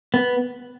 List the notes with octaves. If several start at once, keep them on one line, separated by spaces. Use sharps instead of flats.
B3